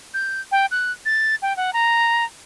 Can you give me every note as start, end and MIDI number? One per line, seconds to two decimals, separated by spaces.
0.14 0.41 91
0.52 0.66 79
0.71 0.92 90
1.06 1.35 93
1.42 1.55 79
1.57 1.73 78
1.73 2.24 82